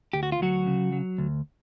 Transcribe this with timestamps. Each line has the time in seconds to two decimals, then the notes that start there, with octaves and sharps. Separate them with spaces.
0.13 D2 G4
0.23 F#4
0.32 F4
0.40 D2 F#3 F#4
0.67 C#3
0.92 F#3
1.18 D2